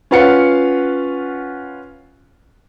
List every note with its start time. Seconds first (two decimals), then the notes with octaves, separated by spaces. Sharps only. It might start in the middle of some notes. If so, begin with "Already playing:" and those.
0.11 C#4 F4 B4 F5 F#5 C#7